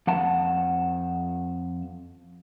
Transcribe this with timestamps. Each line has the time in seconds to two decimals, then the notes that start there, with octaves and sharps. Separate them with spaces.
0.07 F2 F#5 A5